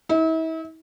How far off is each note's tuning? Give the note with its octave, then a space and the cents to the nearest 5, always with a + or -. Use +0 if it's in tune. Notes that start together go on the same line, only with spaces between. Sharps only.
E4 -40